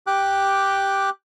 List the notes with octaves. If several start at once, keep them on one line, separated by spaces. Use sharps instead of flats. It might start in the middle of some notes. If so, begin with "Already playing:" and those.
G4 G5 D6 F#6